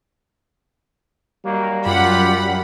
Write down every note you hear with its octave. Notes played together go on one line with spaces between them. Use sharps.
D#3 F#3 G3 A#3
F#2 F4 G4 F#5 B5